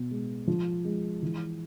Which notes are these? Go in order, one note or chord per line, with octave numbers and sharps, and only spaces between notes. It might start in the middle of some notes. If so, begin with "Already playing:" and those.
Already playing: B2
G#3
F3
G#3
E3